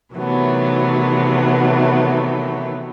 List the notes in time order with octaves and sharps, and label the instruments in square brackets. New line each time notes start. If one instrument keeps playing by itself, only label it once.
[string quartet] C3 D#3 E3 F#3 A3 B3